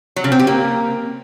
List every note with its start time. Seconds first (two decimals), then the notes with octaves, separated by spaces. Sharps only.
0.16 F#3
0.24 C#3
0.32 C4
0.39 G4
0.47 A#3